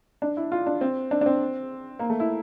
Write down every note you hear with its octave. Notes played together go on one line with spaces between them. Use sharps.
D4
E4
F4
D4
C4
D4
D4
C4
A#3
A3
E4